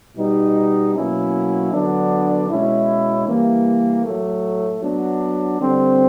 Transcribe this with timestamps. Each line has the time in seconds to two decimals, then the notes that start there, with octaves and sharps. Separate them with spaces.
0.17 B2 G3 B3 D#4
0.95 B2 F#3 A#3 C#4 E4
1.73 D3 F#3 B3 D4
2.50 B2 G#3 C#4 E4
3.27 E3 G3 A#3
4.05 A2 F#3 A3
4.81 F#3 B3 D4
5.60 D3 G3 C4